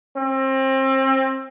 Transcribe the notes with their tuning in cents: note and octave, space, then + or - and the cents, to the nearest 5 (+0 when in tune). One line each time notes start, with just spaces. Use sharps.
C4 +30